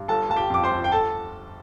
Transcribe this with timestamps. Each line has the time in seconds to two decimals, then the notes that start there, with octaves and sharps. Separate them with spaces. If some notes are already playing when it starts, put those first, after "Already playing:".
Already playing: G2
0.08 G1 A4 A5
0.29 G1 A5
0.36 G4 G5
0.50 F2 D6
0.63 C5 C6
0.71 G1
0.84 G5
0.92 A4 A5